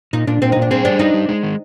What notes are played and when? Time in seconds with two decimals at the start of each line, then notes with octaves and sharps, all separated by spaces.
0.13 A#2 D#4
0.27 A#2 D4
0.42 A#2 C4
0.52 A#2 D#4
0.62 D4
0.71 C4 G#4
0.85 G3 D4
0.99 D4 D#4
1.14 G3
1.29 G#3
1.43 D#3